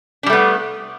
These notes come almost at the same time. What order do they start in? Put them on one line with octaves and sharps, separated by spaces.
D4 G3 A3 B3